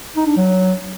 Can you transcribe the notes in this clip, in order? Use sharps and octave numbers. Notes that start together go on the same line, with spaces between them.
D#4
D4
F#3